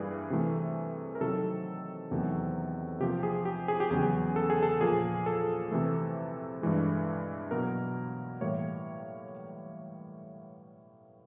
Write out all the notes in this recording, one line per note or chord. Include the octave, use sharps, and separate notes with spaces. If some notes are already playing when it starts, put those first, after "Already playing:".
Already playing: G2 E3 G3 A#3 G#4
C3 E3 A3
A#4
C3 D#3 F#3 A4
E2 C3 D#3 F#3 A3
C3 F3 A#3 G4
G#4
G4
G#4
G4
E2 C#3 F#3 G#4
A4
G#4
A4
A#2 F3 A#3 G#4
A4
C3 E3 A3
G2 E3 G#3
B2 F#3 A#3 A#4
A2 E3 G3 A#3 C#5